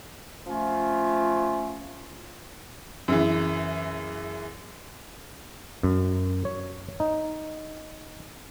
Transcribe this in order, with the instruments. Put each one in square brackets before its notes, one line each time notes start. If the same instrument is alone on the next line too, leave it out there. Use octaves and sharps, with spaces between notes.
[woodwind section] F3 A3 C#4 F4
[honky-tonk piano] F#2 C#3 E3
[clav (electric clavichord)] F#2
C#5
D#4